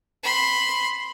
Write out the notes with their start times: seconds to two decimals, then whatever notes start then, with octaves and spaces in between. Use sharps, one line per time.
0.23 B5 C6